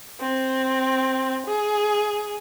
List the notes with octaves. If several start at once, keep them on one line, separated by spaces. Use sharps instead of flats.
C4
G#4